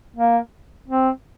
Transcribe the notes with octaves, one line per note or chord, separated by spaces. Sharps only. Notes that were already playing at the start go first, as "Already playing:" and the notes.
A#3
C4